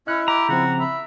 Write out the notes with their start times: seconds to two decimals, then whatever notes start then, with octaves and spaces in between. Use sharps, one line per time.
0.07 C#4 E4 D#5 F#6
0.28 G4 A#5
0.49 C#3 F3 C4 F#4
0.79 E5 B5